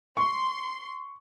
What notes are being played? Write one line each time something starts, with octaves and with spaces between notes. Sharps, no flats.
C6 C#6